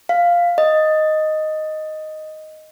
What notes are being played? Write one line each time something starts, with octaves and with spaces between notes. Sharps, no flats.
F5
D#5